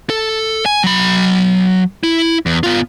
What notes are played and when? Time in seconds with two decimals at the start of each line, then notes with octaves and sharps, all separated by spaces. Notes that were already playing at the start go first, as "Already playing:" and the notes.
0.10 A4
0.66 G#5
0.84 F#3 B5
2.03 E4
2.46 E2
2.63 B3 F4